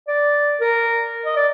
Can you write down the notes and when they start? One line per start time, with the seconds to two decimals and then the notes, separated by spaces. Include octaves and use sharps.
0.08 D5
0.61 A#4
1.26 D#5
1.36 D5